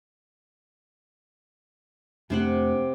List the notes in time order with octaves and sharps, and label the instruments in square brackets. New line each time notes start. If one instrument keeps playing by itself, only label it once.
[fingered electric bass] F2 A3 D4 [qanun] C3 C5 F#5